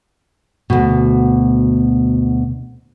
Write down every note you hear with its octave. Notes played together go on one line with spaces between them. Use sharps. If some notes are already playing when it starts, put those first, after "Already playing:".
D2 B2